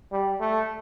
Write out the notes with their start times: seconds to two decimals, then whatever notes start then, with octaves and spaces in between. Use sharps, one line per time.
0.12 G3
0.40 A3